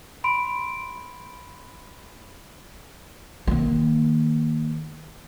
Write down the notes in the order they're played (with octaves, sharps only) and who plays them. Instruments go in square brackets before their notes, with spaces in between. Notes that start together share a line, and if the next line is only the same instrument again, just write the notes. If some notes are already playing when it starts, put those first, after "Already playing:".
[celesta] B5 C6 D7
[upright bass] D#3 A#3